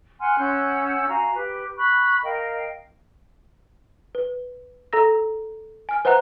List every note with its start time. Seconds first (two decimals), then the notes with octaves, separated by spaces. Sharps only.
0.20 F#5 G#5 C6 F6
0.39 C#4 F#5 E6 G6
1.08 F#4 F5 G#5 A#5
1.35 G4 B4
1.77 B5 C#6 F#6
2.24 A#4 D#5 F5 G5
4.15 B4
4.93 A4 A#5 E6 A#6
5.89 G#5 F6
6.05 B4 C5 E5 F#5 A#5 F#6